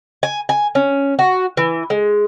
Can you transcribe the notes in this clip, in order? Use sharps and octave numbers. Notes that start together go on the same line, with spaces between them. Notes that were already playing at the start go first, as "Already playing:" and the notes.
G#5
G#5
C#4
F#4
E3
G#3